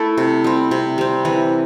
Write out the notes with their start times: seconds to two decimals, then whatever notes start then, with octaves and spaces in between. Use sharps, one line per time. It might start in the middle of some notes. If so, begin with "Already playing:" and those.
Already playing: A3 E4 A4
0.18 C3
0.44 G3 C4
0.71 C3
0.98 G3 C4
1.25 E3